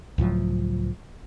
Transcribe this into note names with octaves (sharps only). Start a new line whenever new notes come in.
C#2 A2 F3 F#3